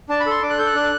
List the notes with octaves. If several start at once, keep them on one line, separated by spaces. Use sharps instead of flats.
D4 A5
B5
A4 C6
D4 D6
F#6
A4 G6
F#6
D4